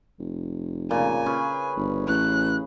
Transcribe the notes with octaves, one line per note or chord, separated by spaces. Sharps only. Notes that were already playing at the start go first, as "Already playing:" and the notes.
F1
A#2 C#3 G#5
C#4 G#4 B4
G1
A1 F#6